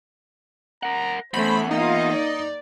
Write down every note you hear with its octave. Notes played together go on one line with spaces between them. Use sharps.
A#4 F#5 A#5
E2 A3 C#4 C5 B5
A#3 D#4 F4 D#5
D5